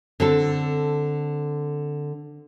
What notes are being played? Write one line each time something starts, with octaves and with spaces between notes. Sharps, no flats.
D3 C4 A4